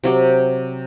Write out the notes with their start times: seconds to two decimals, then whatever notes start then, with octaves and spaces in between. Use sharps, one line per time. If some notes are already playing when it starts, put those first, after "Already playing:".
0.04 C3 F#3 G4